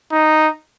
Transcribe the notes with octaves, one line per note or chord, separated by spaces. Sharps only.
D#4